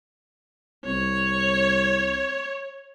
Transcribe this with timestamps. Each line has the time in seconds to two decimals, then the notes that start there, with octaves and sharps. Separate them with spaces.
0.85 C2 C#5